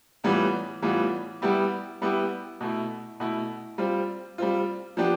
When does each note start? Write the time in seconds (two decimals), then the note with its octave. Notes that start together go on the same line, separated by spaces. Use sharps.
0.24 A2 E3 G3 B3 F4
0.82 A2 E3 G3 B3 F4
1.42 G3 B3 E4 G4
2.02 G3 B3 E4 G4
2.61 B2 A3 E4
3.20 B2 A3 E4
3.78 G3 C4 F4
4.38 G3 C4 F4
4.97 F3 B3 D4 G4